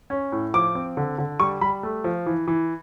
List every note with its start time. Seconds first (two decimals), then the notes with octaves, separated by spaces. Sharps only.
0.10 C#4
0.32 A2
0.54 F3 D6
0.75 C4
0.97 D3
1.18 D3
1.40 G3 C#6
1.61 G3 B5
1.83 A3
2.04 F3
2.26 E3
2.48 E3